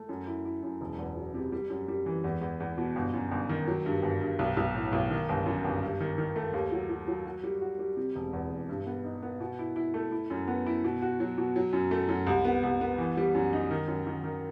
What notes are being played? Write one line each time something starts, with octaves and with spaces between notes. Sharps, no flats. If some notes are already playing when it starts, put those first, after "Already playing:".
Already playing: A3
F#2
E4
E4
F#2
E1
E2
F#3
C3
G3
F#2
G3
E3
E2
E2
E2
B2
G1
F#2
G1
D#3
F#3
G2
G1
G2
B1
B1
A2
B1
D#3
G1
F#2
G1
G2
D#3
D#3
A3
D#2
F#3
F#3
F#3
F#4
G3
F#4
G3
C3
E1
E2
E1
G2
B3
D#4
B3
B2
E4
E4
A3
E4
F#2
B3
E4
B2
F#4
F#3
B2
F#3
F#2
A3
F#2
C2
B3
C2
B3
E3
G3
F#2
D#4
D#3
F#2
D#3
D#3